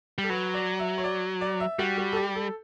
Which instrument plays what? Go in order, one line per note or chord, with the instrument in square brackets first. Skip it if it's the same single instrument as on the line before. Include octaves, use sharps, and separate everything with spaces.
[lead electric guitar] G3 [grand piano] A4
[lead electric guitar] F#3 [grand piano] B4
[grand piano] D5
E5
C#5
D5
D5
E5
[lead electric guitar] G3 [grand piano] F#4
[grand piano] F#4
A4
G4
A4